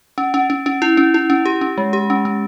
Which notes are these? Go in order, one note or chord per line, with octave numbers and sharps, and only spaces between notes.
C#4
C#4
C#4
C#4
E4
C#4
E4
C#4
G4
C#4
G#3
G4
C#4
C#4